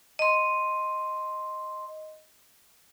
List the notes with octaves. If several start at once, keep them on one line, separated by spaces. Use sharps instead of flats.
D#5 C6